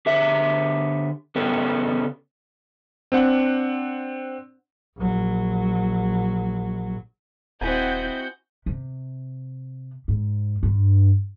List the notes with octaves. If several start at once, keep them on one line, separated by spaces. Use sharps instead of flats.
D3 G4 E5
C#3 B3 C#4 G4 A4
C4 D4 F#5
A#1 F#3
D#1 C4 E4 F#4 D#5 F#5 G#5 G6
C3
G#2
G2